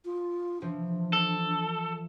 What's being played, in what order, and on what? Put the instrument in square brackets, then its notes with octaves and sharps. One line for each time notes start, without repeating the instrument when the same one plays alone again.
[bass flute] F4
[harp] E3 F3 [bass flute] D4
[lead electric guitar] A4